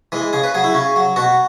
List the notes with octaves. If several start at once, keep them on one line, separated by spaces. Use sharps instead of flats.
E3 G#3
C#3 G#4
B4
F#3 G#4
E4
C#3 C#4
F#3
B2 F#4